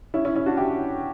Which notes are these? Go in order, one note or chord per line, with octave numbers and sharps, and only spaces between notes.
C#4 E4
C#4 E4
C#4 E4
D4 F#4
E4 G4